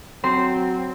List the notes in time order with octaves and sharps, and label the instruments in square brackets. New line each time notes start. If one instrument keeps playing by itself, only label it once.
[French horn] F#3 [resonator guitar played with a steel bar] C4 [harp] C6